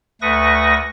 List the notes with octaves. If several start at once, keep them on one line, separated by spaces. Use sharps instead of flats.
D2 A3 B4 C#6 D#6 A#6